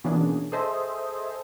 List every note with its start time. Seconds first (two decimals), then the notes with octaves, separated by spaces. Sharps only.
0.04 B2 E3 A#3 C#4 D4 G#4
0.52 G#4 A4 C5 D#5 E5